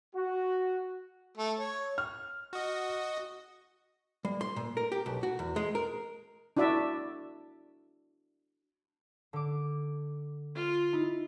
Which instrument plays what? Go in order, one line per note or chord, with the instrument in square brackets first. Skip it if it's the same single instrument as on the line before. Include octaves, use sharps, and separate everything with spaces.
[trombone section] F#4
[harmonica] A3
C#5
[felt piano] F6
[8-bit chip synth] F#4 D#5
[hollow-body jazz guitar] G3
C6
A#2
A#4
G4
B1
F#4
E2
G#3
A#4
[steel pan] D4 E4 F#4 D5 E5
[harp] D3 D6
[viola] F4
[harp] D#4 E4